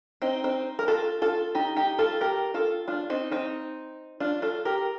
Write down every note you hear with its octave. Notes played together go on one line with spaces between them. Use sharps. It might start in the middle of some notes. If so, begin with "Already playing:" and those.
C4 D#4
C4 D#4
A#4
F4 A4
F4 A4
D#4 G4
D#4 G4
F4 A4
G4 A#4
F4 A4
D4 F4
C4 D#4
C4 D#4
D4 F4
F4 A4
G4 A#4